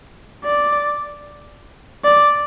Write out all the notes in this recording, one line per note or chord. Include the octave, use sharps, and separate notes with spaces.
D5
D5